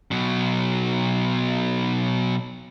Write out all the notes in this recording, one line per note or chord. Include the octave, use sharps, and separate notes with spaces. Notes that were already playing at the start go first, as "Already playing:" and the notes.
B2 F#3